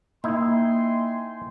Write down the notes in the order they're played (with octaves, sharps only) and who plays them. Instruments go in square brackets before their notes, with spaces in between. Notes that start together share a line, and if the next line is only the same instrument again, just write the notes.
[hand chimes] A#3 [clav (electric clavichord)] D#4 E4 [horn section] G5 G#5 C6